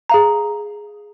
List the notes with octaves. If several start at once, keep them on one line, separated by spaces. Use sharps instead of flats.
G#4 F5 A#5